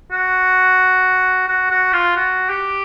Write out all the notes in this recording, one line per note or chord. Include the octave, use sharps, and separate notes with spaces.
F#4
F#4
F#4
F4
F#4
G4